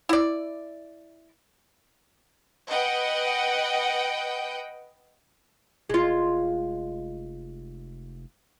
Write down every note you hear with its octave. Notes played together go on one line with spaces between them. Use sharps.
E4 D5
B4 D#5 F#5 G5
F1 G#3 F4